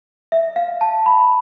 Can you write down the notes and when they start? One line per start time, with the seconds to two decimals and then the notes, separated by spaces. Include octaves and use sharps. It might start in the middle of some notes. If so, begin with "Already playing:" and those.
0.32 E5
0.56 F5
0.81 A5
1.06 B5